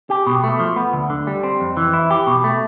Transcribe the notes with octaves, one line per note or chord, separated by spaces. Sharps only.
G4
B2
A3
F3
B3
D2
D3
G3
C4
F2
E3
E4
G4
B2
A3